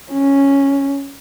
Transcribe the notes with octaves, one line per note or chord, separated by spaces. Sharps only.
C#4